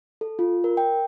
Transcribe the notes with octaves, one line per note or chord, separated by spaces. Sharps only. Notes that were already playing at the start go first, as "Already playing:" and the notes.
A4
F4
A#4
G5